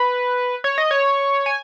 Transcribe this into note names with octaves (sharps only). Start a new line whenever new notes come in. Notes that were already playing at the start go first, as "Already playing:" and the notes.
Already playing: B4
C#5
D#5
C#5
G#5